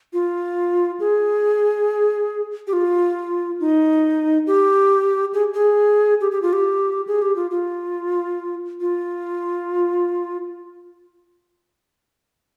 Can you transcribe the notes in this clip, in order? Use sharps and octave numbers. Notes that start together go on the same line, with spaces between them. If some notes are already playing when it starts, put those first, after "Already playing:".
F4
G#4
G4
F4
D#4
G4
G#4
G#4
G4
G4
F4
G4
G#4
G4
F4
F4
F4